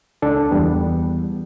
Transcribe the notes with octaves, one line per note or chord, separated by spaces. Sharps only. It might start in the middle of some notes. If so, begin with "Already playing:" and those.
C#2 D4 A4
E2 G3 B3